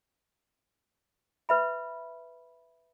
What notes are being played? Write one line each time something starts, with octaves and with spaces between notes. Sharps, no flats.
B4 E5 B5